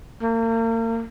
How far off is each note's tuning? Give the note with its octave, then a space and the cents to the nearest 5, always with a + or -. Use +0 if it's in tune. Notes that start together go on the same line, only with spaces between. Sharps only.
A#3 -40